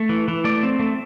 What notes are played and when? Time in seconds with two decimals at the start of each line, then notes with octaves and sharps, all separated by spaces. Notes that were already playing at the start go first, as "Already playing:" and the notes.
Already playing: A3
0.09 E3
0.28 E3
0.44 A3 D5
0.63 C4
0.80 A3